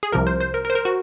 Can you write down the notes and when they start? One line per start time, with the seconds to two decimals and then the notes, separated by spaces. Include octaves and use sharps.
0.03 G#4
0.12 C2 C3 F3 A#4
0.27 C5
0.40 C5
0.54 A#4
0.65 A#4
0.70 C5
0.75 A#4
0.85 F#4